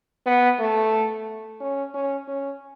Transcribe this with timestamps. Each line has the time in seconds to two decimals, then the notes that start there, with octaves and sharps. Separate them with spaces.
0.26 B3
0.59 A3
1.60 C#4
1.94 C#4
2.28 C#4